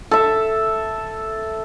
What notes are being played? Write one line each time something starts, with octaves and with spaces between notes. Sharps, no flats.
A4 E5